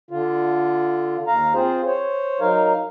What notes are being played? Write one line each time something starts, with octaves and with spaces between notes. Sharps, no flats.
D3 F4
D#2 F5 A#5
C4 F4 G#4 C5
C5 C#5
F#3 D#4 A#4 F5